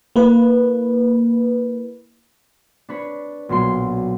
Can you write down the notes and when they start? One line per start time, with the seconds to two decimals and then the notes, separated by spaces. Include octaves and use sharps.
0.16 A#3 E4 B4
2.89 D4 B4 C#5
3.49 B1 A#2 F#3 C6